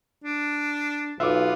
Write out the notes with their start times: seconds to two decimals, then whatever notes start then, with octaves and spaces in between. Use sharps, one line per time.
0.24 D4
1.20 B1 B3 F4 E5 D6